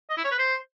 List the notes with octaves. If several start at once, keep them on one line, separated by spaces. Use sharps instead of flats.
D#5
E4
C#5
B4
C5